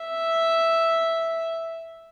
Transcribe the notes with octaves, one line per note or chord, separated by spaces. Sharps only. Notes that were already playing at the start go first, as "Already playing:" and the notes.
Already playing: E5